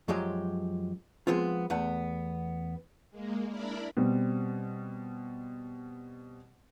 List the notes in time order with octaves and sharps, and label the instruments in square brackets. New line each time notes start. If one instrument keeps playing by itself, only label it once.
[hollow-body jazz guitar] F#2 F3 F#3 G#3 G4
F3 G#3 B3 C4 F4
E2 A3 B3 F#5
[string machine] G#3 A#3
D4 E4 A#4 D5 B5
[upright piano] B2 G3 C4